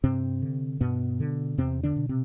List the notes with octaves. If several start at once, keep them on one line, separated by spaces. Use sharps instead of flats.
G2 C3 C4
D3
G2 B2 B3
D3
E2 C3 C4
D3 D4
B2
C3 C4